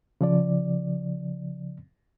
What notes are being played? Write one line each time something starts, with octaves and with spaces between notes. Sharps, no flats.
C#3 F3 D5